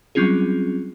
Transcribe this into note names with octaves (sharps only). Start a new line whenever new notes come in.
F#3 G3 C4 C#4 F4 G#4